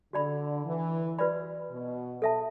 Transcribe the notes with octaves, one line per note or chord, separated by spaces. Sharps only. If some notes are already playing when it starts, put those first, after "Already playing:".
D3 F#4 D5 B5
E3
F#4 B4 D5 B5
B2
A4 E5 A5